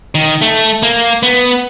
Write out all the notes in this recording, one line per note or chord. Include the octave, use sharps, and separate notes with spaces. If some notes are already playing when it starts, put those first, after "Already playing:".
D#3
A3
A#3
B3